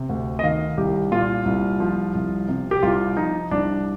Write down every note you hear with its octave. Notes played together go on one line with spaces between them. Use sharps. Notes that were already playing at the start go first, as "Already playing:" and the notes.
Already playing: C3
D2
D#5
D#3 F5
C2 G4
A#2 F4
C2
F3
C2
C3
G4
C2 F4
F3 D#4
C2 D4